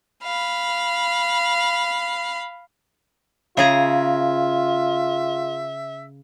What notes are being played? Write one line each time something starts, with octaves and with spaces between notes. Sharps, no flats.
F5 B5
C#3 F4 G#4 E5 A#5